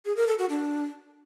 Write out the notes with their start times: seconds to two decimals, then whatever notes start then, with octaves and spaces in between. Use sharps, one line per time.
0.06 G#4
0.17 A#4
0.28 A4
0.38 F#4
0.49 D4